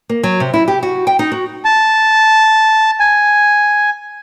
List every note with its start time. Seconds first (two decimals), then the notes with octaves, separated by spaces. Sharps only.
0.09 A#3
0.23 F#3
0.40 C3
0.54 E4
0.68 G4
0.83 F#4
1.07 G5
1.19 D#4
1.32 F#4
1.65 A5
3.00 G#5